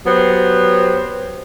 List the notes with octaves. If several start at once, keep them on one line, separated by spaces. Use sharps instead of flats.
F#3 B3 G4 C5